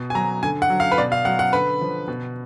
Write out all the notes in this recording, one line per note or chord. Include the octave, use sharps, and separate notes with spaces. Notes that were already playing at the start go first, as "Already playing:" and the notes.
Already playing: B2
G#5
F#3 A#5
D3 G#5
F#5
F#3
F5
B4
B2 D5
F5
F#3 F#5
F#5
D3 B4
F3
B2